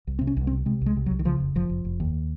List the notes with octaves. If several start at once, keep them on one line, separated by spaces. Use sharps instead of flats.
C2
C4
C3
C#4
C2
C4
C3
C3 G#3
C2 G#3
C3
F#3
C2
D#3
C#3 F3
F1
F1 F3
F1
F1
D#2